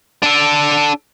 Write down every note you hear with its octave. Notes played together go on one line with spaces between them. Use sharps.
D4 A4